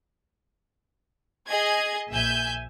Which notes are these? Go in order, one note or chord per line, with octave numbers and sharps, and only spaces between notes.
G#4 D#5 G#6
A#1 E5 G#5 G6